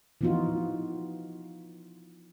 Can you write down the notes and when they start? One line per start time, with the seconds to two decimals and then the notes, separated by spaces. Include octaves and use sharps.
0.21 E3 F3 B3 D#4 F4 F#4